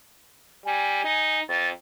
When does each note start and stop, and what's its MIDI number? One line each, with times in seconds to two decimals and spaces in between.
0.66 1.04 55
0.66 1.40 80
1.05 1.40 63
1.49 1.70 41
1.49 1.68 93